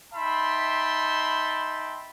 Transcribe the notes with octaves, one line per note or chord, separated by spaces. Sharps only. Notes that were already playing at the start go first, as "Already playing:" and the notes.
D#4 E5 G5 A5 B5 C6